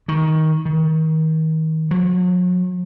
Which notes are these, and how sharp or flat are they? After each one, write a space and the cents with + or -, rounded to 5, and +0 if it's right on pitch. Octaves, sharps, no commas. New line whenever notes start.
D#3 +15
D#3 +35
F#3 -45